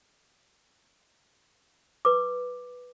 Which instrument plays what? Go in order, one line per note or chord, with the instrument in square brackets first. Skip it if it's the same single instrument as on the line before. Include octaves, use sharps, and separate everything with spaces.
[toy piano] B4 D6